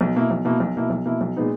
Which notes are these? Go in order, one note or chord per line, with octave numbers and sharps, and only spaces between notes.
B1
B2 A#3 E4
B1
B2 A#3 E4
B1
B2 A#3 E4
B1
B2 A#3 E4
B1
A#2 G#3 B3 D#4